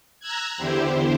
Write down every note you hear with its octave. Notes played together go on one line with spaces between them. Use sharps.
A#5 E6 F#6 G#6
E2 D3 E4 G4 C5